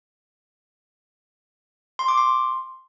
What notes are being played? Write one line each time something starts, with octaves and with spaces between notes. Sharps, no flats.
C6
D6
C6